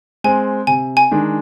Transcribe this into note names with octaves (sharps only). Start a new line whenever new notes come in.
G#3 C4 G#5
C3 G#5
G#5
D#3 G#3 D4